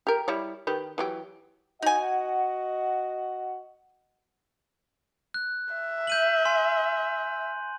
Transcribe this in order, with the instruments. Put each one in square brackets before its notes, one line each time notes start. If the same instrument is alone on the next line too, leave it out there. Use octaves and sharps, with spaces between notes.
[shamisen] G4 A#4
G3 E4 C#5
D#3 G4 B4
E3 F#3 G4
[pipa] D#4 G#5 [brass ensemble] F#4 D#5 F#5
[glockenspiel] F#6
[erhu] E5
[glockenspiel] G6 D#7 F#7
G#5 C6